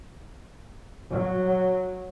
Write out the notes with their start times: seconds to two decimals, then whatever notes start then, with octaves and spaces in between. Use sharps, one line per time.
1.11 F#3